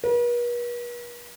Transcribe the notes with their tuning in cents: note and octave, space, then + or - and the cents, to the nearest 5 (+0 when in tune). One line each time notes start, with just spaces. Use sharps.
B4 -45